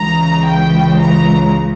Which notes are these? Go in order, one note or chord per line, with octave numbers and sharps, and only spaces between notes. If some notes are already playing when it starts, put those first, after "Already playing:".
Already playing: C#2 C#3 E3 A#5
G5
A#5